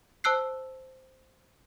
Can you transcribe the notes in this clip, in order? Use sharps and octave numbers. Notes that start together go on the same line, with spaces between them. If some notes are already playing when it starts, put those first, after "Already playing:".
C5 A5 E6 F#6 C7